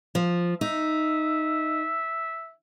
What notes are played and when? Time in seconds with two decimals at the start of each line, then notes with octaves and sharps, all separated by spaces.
0.15 F3
0.61 D#4 E5